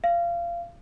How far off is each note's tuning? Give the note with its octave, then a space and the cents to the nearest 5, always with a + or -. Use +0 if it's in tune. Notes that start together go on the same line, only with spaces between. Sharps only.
F5 -25